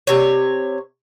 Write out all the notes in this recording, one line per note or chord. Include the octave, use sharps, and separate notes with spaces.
C3 C#5